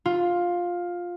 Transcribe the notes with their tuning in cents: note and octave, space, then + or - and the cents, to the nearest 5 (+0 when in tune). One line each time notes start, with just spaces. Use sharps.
F4 +10